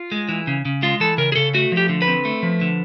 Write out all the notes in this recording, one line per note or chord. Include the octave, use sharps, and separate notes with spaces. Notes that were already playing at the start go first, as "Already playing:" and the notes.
Already playing: F4
G#3
E3
C#3
C#3
G#3 F4
E3 A4
C#3 A#4
G#4
C#3 A4
A3 F#4
F3
G4
D3
B4
C4
A3
F3
D3